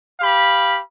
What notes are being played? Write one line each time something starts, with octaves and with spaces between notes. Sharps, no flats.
G4 F5 B5